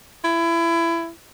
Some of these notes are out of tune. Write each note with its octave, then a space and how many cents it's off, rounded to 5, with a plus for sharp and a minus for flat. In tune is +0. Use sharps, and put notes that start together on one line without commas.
E4 +25